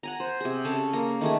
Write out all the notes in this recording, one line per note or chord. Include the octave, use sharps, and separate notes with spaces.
F#5 G#5 A#5
C5
C3 G#4
C#3 A4 A5
A#3
D#3 A3 G#4